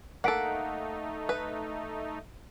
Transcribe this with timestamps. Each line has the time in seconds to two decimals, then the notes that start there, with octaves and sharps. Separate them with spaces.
0.24 A3 A#3 D#4 A4 F#5 B6 D7
1.29 B4